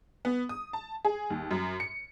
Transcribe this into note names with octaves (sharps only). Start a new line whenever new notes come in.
B3
D#6
A5
G#4
D#2
F#2
C#7